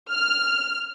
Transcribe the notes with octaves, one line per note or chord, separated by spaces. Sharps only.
F6